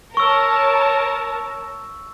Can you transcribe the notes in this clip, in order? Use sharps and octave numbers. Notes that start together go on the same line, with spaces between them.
A#4 C#5 A5 C#6 E6